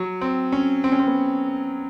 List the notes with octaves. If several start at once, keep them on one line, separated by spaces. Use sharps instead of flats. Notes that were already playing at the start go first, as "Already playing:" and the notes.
Already playing: F#3
C4
C#4
C4
C#4
C4
B3